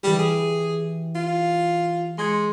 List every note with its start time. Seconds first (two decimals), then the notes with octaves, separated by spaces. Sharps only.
0.03 E3 G3 G4
0.19 G#4
1.15 F4
2.18 G#3 C6 G#6 C#7